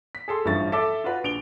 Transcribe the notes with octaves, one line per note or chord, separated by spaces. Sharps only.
B6
G#4 A4 C6
A1 G2 F3 E4 C#6 A6
A4 E5 D6 A6
F4 F#4 B4
A#1 D7 F7 G7